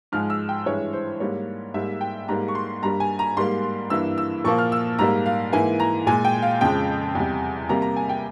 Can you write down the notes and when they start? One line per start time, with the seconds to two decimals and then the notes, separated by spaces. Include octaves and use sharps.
0.12 G#2 F3 G#3 F6
0.30 E6
0.49 G5
0.66 G2 E3 G#3 C#5
0.93 C5
1.20 G#2 G3 A#3 C#5
1.74 G#2 G3 A#3 E5
2.01 G5
2.28 G#2 G3 A#3 A#5
2.48 C#6
2.55 C6
2.83 G2 G3 A#3 A#5
3.00 G#5
3.19 A#5
3.37 G#2 G3 A#3 C6
3.90 G2 E3 A#3 E6
4.18 E6
4.44 A#2 F3 A#3 C#6
4.58 F6
4.72 E6
4.99 G#2 G3 A#3 A#5
5.26 F5
5.52 G#2 E3 A#3 G#5
5.80 A#5
6.07 A#2 G#3 G#5
6.25 G5
6.42 F5
6.61 F2 C#3 F3 G#3 G5
7.15 E2 C3 G3
7.69 C3 G3 A#3 A#5
7.82 A#5
7.96 G#5
8.09 G5